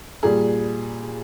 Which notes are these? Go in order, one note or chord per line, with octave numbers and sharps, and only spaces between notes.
A#2 G3 G#4